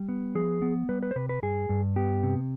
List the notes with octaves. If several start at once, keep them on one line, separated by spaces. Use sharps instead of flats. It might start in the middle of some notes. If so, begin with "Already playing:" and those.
Already playing: G3
B3
F3 G#4
B3
G3 B4
B4
C5
C3 B4
B4
G2 G#4
G2
B3 G4
C3